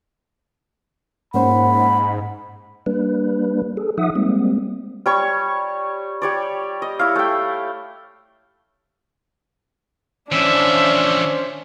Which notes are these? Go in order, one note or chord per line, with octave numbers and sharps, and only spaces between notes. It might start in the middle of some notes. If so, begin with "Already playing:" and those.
G#2 A#3 C#4 C5 F#5 B5
G3 A#3 D4 B4
G#4 A4
F3 D#4 E5 F#5 D#6
G3 G#3 A#3 C4
G3 C#5 C#6
G4 C#5 D5
D#5
E4 C#5 F5
A3 G5
E3 F3 C#4 D4 C5 E5